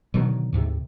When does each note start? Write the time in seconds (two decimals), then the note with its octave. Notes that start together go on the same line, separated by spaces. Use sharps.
0.14 B2 D3 D#3 F#3
0.53 D2 G#2 C3